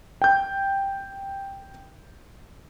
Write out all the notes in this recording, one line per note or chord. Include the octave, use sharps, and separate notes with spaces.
G5 G6